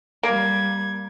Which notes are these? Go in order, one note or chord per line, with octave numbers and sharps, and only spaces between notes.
G3 A#3 G#6